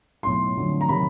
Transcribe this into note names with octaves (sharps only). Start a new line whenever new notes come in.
B1 A2 F#3 A3 C6
F2 D3 F#3 A3
A#5
C3 D#3 F#3 B5